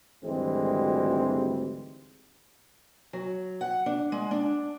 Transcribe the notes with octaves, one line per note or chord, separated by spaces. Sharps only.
G#1 D2 E3 G3 G#3 C4
F#3
F#5
D4
G#3
D4